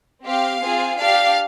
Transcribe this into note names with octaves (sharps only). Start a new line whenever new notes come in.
C4 G4 F5
C4 F4 G#4
D4 G4 F5